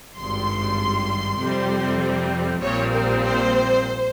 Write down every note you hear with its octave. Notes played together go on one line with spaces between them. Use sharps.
G#1 G2 G3 C6
F2 C3 G3 C4
A#1 A#2 G3 C4 C#5
A#4
C5